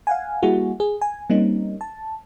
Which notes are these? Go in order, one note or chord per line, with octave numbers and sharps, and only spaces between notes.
F5 F#5 G#5
G3 A#3 E4 F#4 G#4
G#4
G#5
G3 A#3 C4 C#4 D#4
A5